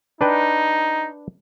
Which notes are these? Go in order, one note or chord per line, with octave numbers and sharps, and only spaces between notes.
D4 D#4 B4 G5